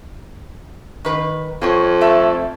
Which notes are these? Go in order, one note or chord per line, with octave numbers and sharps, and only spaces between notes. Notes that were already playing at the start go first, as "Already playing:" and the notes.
D#3 B4
F2 F4 C#5
A3 E5